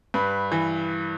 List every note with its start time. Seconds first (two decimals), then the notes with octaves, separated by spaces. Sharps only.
0.14 G2 B4
0.52 E3